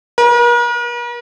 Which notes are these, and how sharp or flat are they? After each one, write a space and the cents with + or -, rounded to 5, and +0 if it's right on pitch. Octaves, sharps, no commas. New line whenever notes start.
A#4 +45